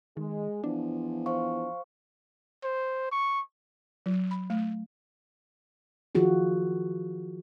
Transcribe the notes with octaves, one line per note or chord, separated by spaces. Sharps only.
D#3 G#3
E2 F3 D4
C5 F5 C#6
C5
C#6
F#3
B5
A3
D#3 F3 F4 F#4 G#4